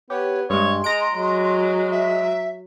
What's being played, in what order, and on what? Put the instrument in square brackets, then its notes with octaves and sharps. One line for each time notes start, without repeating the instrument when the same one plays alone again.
[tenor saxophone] B3 [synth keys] G4 [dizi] C#5
[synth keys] G2 G#3 [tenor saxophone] C#5 [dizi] C6
[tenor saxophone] G#3 [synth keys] A#5 D7
[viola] F#3 [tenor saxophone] G#3
[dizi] E5